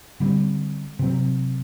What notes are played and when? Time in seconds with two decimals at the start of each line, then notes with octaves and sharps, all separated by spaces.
0.20 D3 G3 C4
0.99 C3 F#3 C4